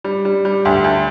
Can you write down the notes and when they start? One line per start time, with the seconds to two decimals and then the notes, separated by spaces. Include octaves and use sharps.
0.04 G3
0.25 G3
0.45 G3
0.65 D2
0.84 D2